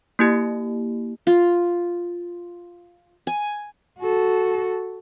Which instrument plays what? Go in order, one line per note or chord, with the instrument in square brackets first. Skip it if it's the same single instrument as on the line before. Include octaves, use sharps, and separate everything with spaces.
[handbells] A#3 E4 G4
[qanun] F4
G#5
[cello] F#4 A4